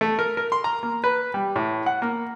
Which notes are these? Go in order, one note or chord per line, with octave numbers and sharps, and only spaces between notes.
A3
A#4
A#4
C6
A#5
A#3
B4
G3
A2
F#5
A#3